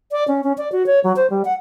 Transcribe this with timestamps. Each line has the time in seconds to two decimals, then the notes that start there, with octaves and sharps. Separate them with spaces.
0.12 D5
0.28 C#4
0.44 C#4
0.58 D5
0.72 F#4
0.87 C#5
1.04 F#3
1.16 C5
1.30 G3
1.45 F#5